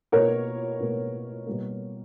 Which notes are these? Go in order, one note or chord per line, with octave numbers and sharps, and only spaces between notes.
B2 A#3 A#4 C#5
B2 A#3
B2 G3 A#3